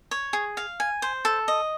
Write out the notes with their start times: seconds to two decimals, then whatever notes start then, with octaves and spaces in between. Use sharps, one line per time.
0.11 C#5
0.33 G#4
0.57 F5
0.80 G#5
1.02 C5
1.25 A4
1.48 D#5